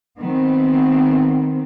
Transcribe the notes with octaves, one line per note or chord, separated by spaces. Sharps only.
D#3 B3 C4